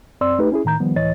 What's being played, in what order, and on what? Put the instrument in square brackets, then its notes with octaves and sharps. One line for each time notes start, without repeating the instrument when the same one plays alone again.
[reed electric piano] F#2 C4 D5 C6 E6
A3 D#4 G4 B4
C#4 E4 G#4
A2 D#3 A#5 G6
D#3 F3 G3 B3
C#2 A2 E3 C#5 D#5 A6